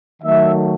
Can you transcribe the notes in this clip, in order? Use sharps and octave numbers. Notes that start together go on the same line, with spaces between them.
D#3 F#3 A3 E5